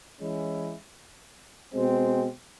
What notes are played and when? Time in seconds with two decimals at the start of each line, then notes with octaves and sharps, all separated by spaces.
0.21 E3 G#3 C#4 E4
1.74 B2 G#3 C4